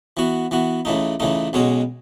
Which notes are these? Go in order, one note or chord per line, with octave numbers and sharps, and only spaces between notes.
E3 B3 F#4
E3 B3 F#4
C#2 C#3 E3 A3 D#4
C#2 C#3 E3 A3 D#4
B1 B2 G#3 C#4 G#4